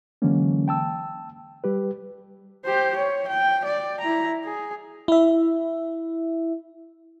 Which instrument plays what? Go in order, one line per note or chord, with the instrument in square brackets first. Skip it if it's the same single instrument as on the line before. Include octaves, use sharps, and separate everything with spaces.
[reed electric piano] D3 E3 F#3 G#3 A#3 C#4
G5 A5 E6
G3 G4 B4
[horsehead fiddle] G4 C5
C#5
G5
D5
E4 A#5
G#4
[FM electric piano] E4 E5